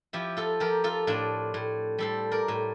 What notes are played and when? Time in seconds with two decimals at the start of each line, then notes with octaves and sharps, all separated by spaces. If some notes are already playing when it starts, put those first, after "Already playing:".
0.13 F3 E4 G4
0.37 F4 A4
0.60 F3 G4 A#4
0.84 F4 A4
1.07 A2 D4 F4
1.54 A2
1.98 G3 A4 C5
2.32 A#4 D5
2.48 A2